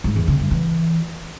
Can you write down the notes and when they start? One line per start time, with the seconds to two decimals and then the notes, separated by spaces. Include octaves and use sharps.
0.04 G#2
0.16 E2
0.28 C#3
0.39 G2
0.51 E3